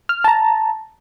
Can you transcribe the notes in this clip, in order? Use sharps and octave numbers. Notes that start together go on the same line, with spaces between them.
F6
A5 A#5